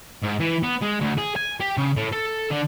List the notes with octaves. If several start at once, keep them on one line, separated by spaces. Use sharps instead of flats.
G#2
E3
B3
G#3
D2
G#4
G#5
G4
C#3
A2
A4
D3